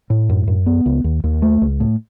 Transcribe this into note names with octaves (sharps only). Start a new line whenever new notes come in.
A2
F#2
F#2
B3
C#2
D#2
D#2
A3
C#2
A2